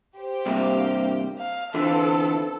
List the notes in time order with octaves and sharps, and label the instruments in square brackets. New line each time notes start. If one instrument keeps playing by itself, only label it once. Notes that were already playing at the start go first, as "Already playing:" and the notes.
[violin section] G4 C5
[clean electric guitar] G2 C3 A#3 [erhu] F5
[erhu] F5
[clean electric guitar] D3 E3 [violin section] B3 C4 F5 [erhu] A4